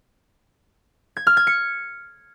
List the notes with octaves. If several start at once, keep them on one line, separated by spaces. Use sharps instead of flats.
G#6
F6
G#6
C#7